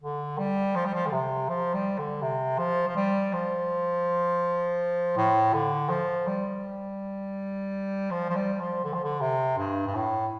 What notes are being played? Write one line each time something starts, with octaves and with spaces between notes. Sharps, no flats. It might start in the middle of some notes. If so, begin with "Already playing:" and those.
D3
G3
F3
G3
F3
D3
C3
F3
G3
D3
C3
F3
F3
G3
F3
A2
D3
F3
G3
F3
F3
G3
F3
D3
F3
D3
C3
G2
G2
A2